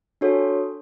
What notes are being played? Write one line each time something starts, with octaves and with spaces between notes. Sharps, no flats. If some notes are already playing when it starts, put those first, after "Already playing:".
D4 F#4 A4 C#5